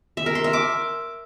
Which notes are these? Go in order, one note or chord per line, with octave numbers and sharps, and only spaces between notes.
E5
A#4
C6
E5
D6